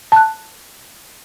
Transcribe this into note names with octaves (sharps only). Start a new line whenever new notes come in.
A5 F#6